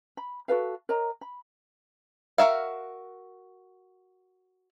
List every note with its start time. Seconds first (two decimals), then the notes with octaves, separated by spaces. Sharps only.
0.17 B5
0.48 F#4 A4 B4 F5
0.89 A#4 C#5 D#5 A#5
1.21 B5
2.38 F#4 A#4 E5 F5